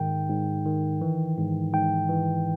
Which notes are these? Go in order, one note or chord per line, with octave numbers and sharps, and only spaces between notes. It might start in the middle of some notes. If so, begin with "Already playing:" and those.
Already playing: G#2 D#3 G5
G#2
D#3
E3
G#2
G#2 G5
E3